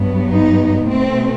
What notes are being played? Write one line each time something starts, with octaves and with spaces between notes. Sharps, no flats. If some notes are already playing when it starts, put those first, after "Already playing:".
Already playing: G2 F#3 B3
D#4
B2 A3 C4